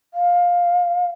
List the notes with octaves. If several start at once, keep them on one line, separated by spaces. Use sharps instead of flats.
F5